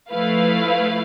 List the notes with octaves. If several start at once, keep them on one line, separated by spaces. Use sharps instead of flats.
F3 A3 E4 B4 F5